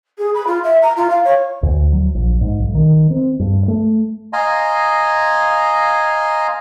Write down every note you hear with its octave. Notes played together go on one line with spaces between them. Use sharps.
G#4
B5
F4
E5
A#5
F4
F5
C#5
D2
F#3
A#1
G#2
B1
D#3
C4
G2
A3
D#5 F5 G#5 A#5 C6